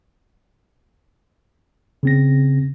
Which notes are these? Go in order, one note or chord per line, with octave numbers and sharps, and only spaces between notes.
C#3 C4 A#6